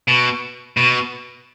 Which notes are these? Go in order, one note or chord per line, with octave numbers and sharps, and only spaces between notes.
B2
B2